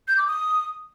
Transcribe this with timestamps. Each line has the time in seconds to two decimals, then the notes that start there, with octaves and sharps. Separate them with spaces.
0.08 G6
0.18 D6
0.27 D#6